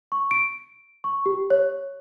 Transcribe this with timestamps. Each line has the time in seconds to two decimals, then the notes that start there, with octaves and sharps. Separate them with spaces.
0.12 C#6
0.31 D7
1.04 C#6
1.26 G4
1.50 C#5